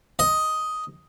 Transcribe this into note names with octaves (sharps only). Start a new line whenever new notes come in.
D#5